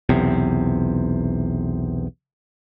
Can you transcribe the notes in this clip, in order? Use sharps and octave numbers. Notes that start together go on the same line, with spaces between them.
B1 E2 C3